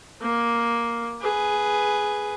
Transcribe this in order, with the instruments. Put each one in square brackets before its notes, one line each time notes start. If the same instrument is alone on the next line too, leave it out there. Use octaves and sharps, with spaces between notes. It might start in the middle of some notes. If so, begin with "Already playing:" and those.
[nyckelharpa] A#3
G#4 B4